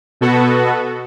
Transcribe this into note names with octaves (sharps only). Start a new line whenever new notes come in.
B2 B3 F#4 A4